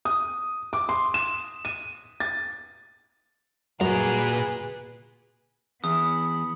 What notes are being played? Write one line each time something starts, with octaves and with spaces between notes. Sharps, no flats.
D#6
D6
C6
E7
D#7
A6
F#2 A#2 F#4 G#4 B4 A#5
E2 B3 D#6